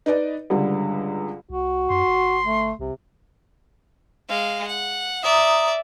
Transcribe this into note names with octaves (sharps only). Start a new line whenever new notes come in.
D#4 B4 D5 D#5
C#2 G2 D3 G3
C2 F#4
F#2 C6
G1
A3
C2 C3
G#3 F5
F#5
D5 E5 A#5 D#6